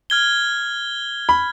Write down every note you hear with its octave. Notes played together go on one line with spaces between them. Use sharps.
F6 G#6 G7
B5